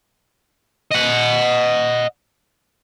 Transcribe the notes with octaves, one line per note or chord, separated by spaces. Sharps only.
D#5 F#5